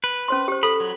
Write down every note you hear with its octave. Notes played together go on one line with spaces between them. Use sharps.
B4
C#4 C5 C6
G4 C5
A4 B5
F#3